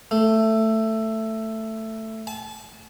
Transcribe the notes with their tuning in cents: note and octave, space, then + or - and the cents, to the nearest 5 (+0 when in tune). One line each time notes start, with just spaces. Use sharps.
A3 +10
A5 -35